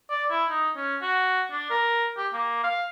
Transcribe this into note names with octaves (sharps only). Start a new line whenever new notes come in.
D5
E4
D#4
C#4
F#4
D4
A#4
G4
A#3
F5